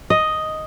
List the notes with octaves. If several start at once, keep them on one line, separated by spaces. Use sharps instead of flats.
D#5